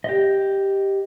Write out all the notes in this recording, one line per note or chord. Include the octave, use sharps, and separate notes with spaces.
G4 D#5